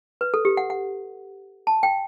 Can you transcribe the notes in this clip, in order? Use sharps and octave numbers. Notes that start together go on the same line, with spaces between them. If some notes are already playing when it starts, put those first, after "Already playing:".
B4
A4
G4
F#5
F#5
A5
G5